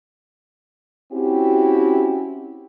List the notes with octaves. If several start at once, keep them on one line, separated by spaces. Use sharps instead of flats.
C4 C#4 E4 F#4 G4